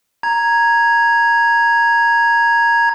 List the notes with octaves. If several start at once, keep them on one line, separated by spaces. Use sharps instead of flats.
A#5 G#6